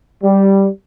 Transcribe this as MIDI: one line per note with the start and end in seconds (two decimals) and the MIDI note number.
0.23 0.67 55